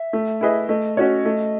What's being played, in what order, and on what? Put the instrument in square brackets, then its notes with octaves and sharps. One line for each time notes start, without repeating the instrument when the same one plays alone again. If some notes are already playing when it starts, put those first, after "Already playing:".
Already playing: [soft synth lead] E5
[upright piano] A3
E4 G#4 B4 D#5
[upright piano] A3 [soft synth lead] D#5
[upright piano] C#4 F#4 C#5 [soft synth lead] D#5
[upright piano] A3